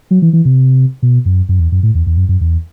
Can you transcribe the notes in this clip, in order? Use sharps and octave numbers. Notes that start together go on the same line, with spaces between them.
F#3
E3
E3
C3
B2
F#2
F#2
E2
F#2
A2
E2
E2
F#2
F#2
E2